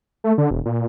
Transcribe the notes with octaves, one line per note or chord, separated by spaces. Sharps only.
A3
D3
E1
A#2